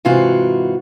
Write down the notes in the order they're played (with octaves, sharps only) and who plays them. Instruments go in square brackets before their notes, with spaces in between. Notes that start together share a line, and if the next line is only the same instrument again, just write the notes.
[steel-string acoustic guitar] G#2 C3 E3 F4 F#4